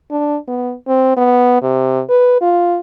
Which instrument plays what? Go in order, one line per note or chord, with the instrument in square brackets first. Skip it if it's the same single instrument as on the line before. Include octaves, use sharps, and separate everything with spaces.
[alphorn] D4
B3
C4
B3
C3
B4
F4